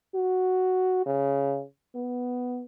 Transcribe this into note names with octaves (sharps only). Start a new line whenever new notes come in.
F#4
C#3
B3